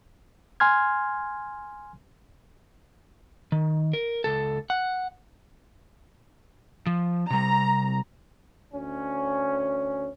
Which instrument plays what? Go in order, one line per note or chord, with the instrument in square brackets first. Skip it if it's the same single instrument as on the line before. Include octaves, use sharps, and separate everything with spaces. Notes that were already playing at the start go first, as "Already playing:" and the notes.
[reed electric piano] G#5 C6 F6 G#6
[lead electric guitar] D#3
A#4
C#2 A4
F#5
[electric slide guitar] F3
[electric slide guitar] C3 G3 [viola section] A#5
[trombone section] D2 C#4